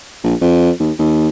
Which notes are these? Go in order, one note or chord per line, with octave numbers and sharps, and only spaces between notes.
A#1
F2
D#2
D#2